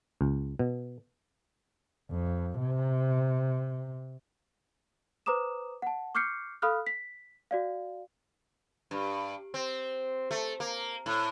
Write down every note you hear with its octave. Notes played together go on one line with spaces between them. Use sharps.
C#2
B2
F2
C3
B4 C5 A#5 D6 D#6 E7
F#5 A5
C#6 D6 F6 G6 C7 C#7
A4 F5 B5 D#6 F6 F#6
B6
F#4 D5 F5
G2
C4
A3
A#3
A2